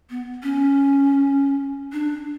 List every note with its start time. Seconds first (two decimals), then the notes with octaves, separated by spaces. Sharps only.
0.10 B3
0.43 C#4
1.93 D4